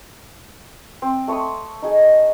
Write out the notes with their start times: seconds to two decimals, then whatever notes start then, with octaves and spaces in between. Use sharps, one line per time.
1.02 C4
1.28 A3 C#5 C6 D#6
1.82 D#4 G#4